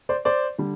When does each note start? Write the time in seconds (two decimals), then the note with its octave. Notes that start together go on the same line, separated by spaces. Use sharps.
0.09 C5 D5
0.25 C5 D5
0.59 D3 G3